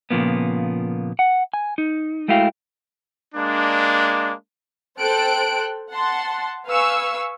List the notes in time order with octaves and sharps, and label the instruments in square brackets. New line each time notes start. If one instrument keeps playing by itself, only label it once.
[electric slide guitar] A#2 C#3 F3 A#3 B3
F#5
G#5
D#4
G#3 A3 E4 F#4 F5 G5
[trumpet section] G#3 A#3 D4
[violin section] A4 C5 G5 A5 F#6 D7
F#5 A5 C6
B4 F5 G#5 C#6 E6